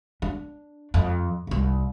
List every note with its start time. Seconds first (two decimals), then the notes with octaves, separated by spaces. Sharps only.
0.22 D4
0.94 F2
1.47 F1 C2